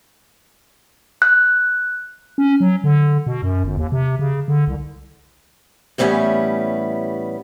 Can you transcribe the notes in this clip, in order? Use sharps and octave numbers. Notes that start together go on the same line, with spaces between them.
F#6
C#4
F#3
D3
B2
F#2
G1
D#2
C3
C#3
D3
C2
A2 E3 G3 B3 C#4